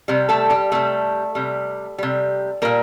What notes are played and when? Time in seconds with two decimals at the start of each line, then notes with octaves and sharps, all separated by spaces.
0.08 C3 G3
0.29 A3 A4
0.50 G3 G4
0.72 C3 G3 A3 A4
1.35 C3 G3
1.98 C3 G3
2.62 A#2 G3 A#3 A#4